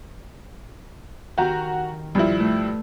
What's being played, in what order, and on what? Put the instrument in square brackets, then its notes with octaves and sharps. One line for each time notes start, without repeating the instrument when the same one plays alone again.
[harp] D#3 G4 [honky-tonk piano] F#4 A#5
[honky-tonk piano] G2 F3 E4
[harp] A3